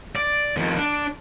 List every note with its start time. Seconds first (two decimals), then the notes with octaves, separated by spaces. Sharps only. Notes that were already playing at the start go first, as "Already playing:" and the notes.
0.16 D5
0.57 F2 D#3
0.77 D4